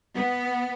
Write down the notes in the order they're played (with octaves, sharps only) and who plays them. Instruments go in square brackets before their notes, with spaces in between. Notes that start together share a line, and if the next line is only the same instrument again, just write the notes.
[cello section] B3